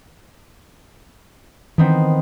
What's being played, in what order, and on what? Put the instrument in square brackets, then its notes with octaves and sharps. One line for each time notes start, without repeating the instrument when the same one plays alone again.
[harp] D#3 B3 C4 [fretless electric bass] E3